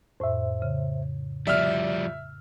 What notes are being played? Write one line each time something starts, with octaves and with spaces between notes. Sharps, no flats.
F2 A2 C5 E5
C#3
F3 G3 D5 E5 F6